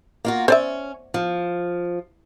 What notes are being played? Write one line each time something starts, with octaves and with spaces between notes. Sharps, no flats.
A#3 F4 F#4
C#4 C5 D5 E5
F3